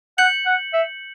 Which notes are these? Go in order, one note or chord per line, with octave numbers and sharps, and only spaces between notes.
F#5 G6 C#7 F#7
F#5
E5